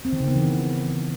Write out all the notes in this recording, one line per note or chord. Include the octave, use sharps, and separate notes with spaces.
C4
D#3
C#3
B3
E3